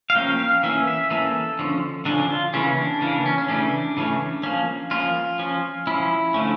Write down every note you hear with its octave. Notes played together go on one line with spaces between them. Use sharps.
F5
F3 A#3 C#4 G5
F5
E3 A#3 C#4 E5
E5
E3 A#3 C#4 A4
D3 F3 C#4
D3 F3 C#4 D4
D4
F4
C#3 E3 A#3 C#4
D4
C#3 E3 A#3 D4
C#4
C#4
C#3 E3 A3 C#4 D4
C#3 E3 A3 C#4
F3 A#3 C#4
F3 A#3 C#4 F4
F3 C#4
F3 C#4 E4
D3 F3 A3 C#4